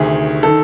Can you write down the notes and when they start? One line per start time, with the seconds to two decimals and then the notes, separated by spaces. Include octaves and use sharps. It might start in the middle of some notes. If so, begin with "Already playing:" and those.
Already playing: D2 C3 D#3 G#4
0.43 D#3 A4